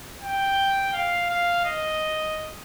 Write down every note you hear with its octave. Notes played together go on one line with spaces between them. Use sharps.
G5
F5
F5
D#5